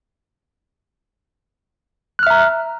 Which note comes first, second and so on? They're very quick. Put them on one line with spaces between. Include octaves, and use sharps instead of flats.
F#6 F6 E5 A#5